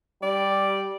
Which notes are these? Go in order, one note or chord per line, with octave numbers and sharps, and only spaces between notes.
G3 D5